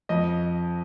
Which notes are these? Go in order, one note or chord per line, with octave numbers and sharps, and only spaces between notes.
F2 D#5